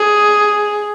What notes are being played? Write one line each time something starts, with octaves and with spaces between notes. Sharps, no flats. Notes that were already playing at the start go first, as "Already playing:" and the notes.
Already playing: G#4